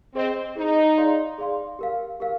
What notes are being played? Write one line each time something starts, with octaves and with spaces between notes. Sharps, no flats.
C4 G#4 C5 D#5
D#4 G#4 C5 D#5
G#4 D5 F5 C6
G#4 D5 F5 C6
G4 A#4 F5
G4 A#4 F5